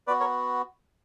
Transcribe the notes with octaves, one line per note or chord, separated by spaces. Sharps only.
B3 F#4 B4 D5
A#4 C#5